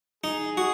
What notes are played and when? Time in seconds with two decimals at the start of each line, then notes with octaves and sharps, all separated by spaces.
0.24 D#4 G#4
0.57 F#4